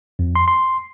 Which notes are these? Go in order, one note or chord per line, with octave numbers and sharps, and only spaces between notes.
F2
C6
C6